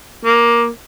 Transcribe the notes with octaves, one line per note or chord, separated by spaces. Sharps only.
A#3